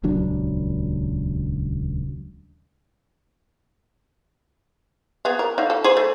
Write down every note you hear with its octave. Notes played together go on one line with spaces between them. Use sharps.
D#1 C#2 F#3 D4
B3 G#4 F5
A#4
D3 D#4 F5
A4
G#4 B4 C5
A3